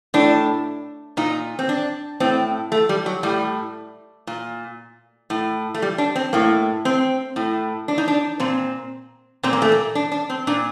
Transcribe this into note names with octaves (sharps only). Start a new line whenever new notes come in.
A2 D4
A#2 D#4
C4
D4
A2 C4
A3
G3
F#3
A2 G3
A#2
A2
A3
G3
D4
C4
A2 A#3
C4
A2
D4
D#4
D4
A#2 C4
A#2 C4
A#3
A3
A#3
D4
D4
C4
A#2 D4